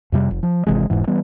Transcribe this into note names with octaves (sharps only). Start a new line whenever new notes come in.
F2 C3 G3
F1
F3
G#1 C3 E3 G#3
E1 G#2 E3
E3 G3 B3